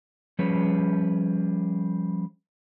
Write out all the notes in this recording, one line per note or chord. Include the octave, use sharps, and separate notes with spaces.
F3 G3 C#4 G#4 B4 C#5